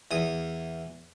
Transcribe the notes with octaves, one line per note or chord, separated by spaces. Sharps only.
E2 D#6